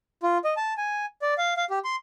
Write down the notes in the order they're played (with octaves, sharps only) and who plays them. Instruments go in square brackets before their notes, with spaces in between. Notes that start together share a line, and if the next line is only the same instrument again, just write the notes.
[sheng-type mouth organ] F4
D#5
A5
G#5
D5
F5
F5
G4
C6